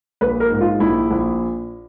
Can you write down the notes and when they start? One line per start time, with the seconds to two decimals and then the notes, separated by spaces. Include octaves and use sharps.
0.21 A#1 B4
0.40 A#4
0.50 G#2
0.61 F4
0.80 A#1 E4
1.10 A#1